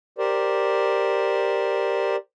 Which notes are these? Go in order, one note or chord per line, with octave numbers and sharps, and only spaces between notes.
G4 A#4 C5 D5